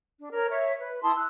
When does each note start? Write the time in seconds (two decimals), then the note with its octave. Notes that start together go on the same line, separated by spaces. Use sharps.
0.20 D4
0.33 A#4 C#5
0.51 C#5 E5
0.79 B4
1.03 E4 A5 C6 D#6
1.16 E6 F#6